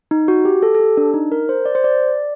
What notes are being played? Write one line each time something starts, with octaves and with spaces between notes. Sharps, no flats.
D#4
F#4
G4
A4
A4
G4
D4
D#4
A#4
C5
D5
C5
D5